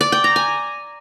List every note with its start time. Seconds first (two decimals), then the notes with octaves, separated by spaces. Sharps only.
0.01 D5
0.12 G5
0.24 A#5
0.36 G#5